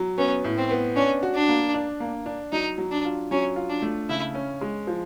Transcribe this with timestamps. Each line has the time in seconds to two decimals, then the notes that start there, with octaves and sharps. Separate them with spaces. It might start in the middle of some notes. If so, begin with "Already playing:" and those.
Already playing: F#3
0.18 B3 C#4
0.44 A2
0.58 C4
0.71 B3
0.96 C#4 D4
1.23 F#4
1.35 D4
1.48 A#3
1.74 D4
2.00 A#3
2.26 D4
2.52 F#3 D#4
2.78 F#3
2.91 D4
3.05 F4
3.31 F#3 C#4
3.56 F4
3.69 D4
3.82 A3
4.09 C#3 E4
4.35 C#4
4.61 G#3
4.87 F3